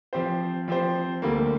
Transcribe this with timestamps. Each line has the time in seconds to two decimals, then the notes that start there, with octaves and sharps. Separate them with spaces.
0.13 F3 C4 G4 C5
0.68 F3 C4 G4 C5
1.22 D2 D3 G3 A#3